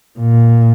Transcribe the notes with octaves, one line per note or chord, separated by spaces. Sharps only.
A#2